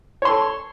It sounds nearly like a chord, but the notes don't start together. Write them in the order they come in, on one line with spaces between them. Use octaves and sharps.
C#5 C6 A4